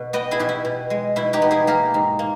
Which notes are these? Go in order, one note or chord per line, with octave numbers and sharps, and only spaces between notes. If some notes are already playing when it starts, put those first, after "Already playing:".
Already playing: B2 B4
B3 D#5 G5
E4 G#4
B2 G4
E4
B2
G#3
B2 E4
D#4 G4
B3
E4 G#4
A#3 G4 A#4
G#2
A#3